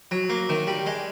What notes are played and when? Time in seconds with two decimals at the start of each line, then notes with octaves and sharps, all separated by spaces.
0.11 F#3
0.30 A#3
0.49 D#3
0.67 G3
0.86 G#3